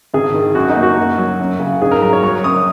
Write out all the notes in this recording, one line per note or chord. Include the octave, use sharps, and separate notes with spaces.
G#1 G#4
D#3
F#2 F#4
D#4
A#3
F#4
A#3
F#3
F#2
C#3
G#2 G#4
A#4
F#3 A#4
C#5
F#3 C#6
F#2 D#6